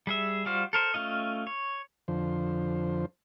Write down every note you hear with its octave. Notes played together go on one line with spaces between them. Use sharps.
G3 G#4 E5
G3 F4 F#4 C5
A4 A#4 C5
A3 C#4 F4 D#5
C#5
F2 D3 F3 C5